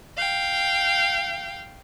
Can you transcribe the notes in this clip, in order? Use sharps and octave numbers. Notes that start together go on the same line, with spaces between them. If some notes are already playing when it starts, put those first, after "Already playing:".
F5 G5